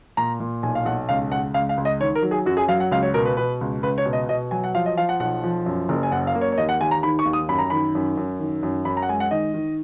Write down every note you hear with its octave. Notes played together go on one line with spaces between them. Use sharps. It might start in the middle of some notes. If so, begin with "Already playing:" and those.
A#2 A#5
A#2
B1 G#5
F5
B1 F#5
C#2 F5
C#2 F#5
C#2 F5
F5
C#2
D#5
D#3 C#5
A#4
F#3
G#4
F#2 F#4
G#4
F#3 F5
F#5
C#2 F5
C#5
B2 A#4
B4
B2 B4
C#2
C#2 B4
C#5
B2
D#5
B2 D#5
F#3 G#5
F#5
F3 F5
D#5
F3 F5
F#5
B1 F#5
F3
F#2
F#1
G#5
F#2 F#5
F5
A#3
C#5
C#5
D#2 D#5
F#5
D#2 G#5
A#5
D#3 B5
C#6
D#2
D#6
F#2 B5
A#5
D#3 B5
F#2
F#2
D#3
F#2
F#2 B5
A#5
F#5
G#3 G#5
F#5
D#3 D#5
D#3